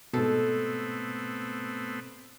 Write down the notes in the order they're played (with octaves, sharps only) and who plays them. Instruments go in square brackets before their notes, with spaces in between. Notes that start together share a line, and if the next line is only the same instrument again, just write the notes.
[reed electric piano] G#2 B2 [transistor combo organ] A3 B3 C4 [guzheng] A4